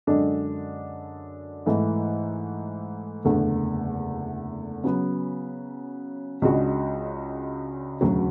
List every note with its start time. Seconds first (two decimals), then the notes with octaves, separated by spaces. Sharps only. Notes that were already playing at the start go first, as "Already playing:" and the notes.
0.07 F#2 D3 G#3 D4 A4
1.66 G#2 E3 A3
3.25 F#1 E2 D3 A3
4.84 C#3 F#3 B3
6.42 C#2 C#3 G#3 D4 F#4
8.01 E1 D2 C#3 F#3